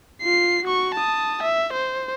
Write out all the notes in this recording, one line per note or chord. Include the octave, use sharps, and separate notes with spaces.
F4 C7
F#4 C#6
A5 D#6
E5
C5